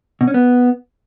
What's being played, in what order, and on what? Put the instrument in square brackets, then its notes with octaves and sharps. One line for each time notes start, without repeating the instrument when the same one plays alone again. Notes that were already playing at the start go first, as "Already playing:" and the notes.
[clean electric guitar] B2
C#4
B3